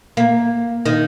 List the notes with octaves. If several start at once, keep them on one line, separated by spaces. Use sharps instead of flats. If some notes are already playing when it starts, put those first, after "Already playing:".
A#3
D#3